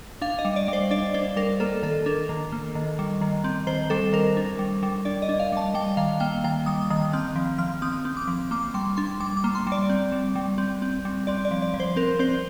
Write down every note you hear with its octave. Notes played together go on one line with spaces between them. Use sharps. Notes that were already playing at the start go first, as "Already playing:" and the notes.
D4 F5
D#5
G3
D5
G3 C5
D4 D5
D4 C5
G3 A#4
A#3 A4
D#3 A4
D4 A#4
D#3
A#3
D#3
G3
D#3
C4
D#3 C5
G3 A4
D#3 A#4
D4
G3
G3
D4 D5
D#5
D4
F5
G3 A5
G3 G5
D#3 F5
A#3 G5
D#3 G5
G3 D#6
D#3 D#6
C4 F6
F3
F3 F6
C4 D#6
C4
D6
F3
A#3 D6
G3 C6
D4 C6
G3 D6
D6
A#3
C6
G3
D5
C4
G3
G3
C4
C4
G3
C4 D5
D5
F3
D5
F3
C5
C4 A#4
C4 C5